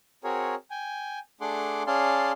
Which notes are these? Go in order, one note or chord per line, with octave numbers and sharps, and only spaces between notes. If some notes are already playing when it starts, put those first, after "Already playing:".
C4 F#4 G#4 A#4 C#5
G5 G#5
A3 D4 G#4 F#5 C6 D6
C#4 G#4 D5 F5 A5 C6